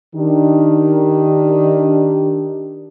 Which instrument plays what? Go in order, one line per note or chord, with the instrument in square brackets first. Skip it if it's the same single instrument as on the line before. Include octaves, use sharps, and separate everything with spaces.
[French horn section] D#3 D4 G4